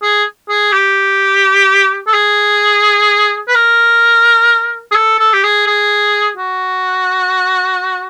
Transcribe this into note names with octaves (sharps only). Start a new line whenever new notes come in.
G#4
G#4
G4
A4
G#4
B4
A#4
G#4
A4
A4
G4
G#4
G#4
F#4